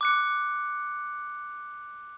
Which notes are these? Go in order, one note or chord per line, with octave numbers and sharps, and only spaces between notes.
D6 F#6 C#7